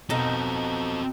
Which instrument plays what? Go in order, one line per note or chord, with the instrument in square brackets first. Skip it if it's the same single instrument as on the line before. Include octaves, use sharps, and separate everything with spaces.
[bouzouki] B2 D#4 [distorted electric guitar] C4 A4